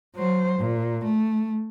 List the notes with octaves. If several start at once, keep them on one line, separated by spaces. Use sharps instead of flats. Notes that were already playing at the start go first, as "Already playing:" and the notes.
F#3 C5
A#2
A3